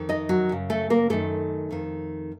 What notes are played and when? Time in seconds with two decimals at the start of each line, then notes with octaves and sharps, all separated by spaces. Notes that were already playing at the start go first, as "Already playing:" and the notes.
Already playing: F2 D#3
0.09 D#4 D#5
0.29 F#3 F#4
0.49 F#2 C#3
0.70 A3 A4
0.90 A#3 A#4
1.10 F#2 D#3 A3 A4
1.71 F2 D#3